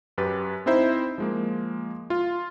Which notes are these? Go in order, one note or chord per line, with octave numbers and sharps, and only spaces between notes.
F#2 G4 B4 A6
C4 D#4 E4 C5 E5
F3 G#3 A#3
F4 F5